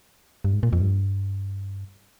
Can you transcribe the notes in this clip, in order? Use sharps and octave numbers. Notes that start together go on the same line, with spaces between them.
G2
G#2
A#2
F2
G2